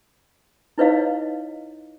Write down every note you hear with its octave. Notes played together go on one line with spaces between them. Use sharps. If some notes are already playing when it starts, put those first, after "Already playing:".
D#4 E4 B4 C#5 D#5 F5